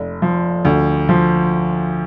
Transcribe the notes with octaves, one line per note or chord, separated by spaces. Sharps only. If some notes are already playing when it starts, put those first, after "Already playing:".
Already playing: F1
F3
D2
F3